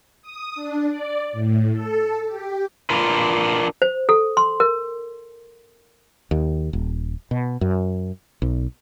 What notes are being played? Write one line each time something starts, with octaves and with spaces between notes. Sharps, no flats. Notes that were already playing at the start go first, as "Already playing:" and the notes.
D#6
D4
D5
A2
A4
G4
D4 F4 A#4 B4
C5
A4
C6
A#4
D#2
D#1
B2
F#2
B1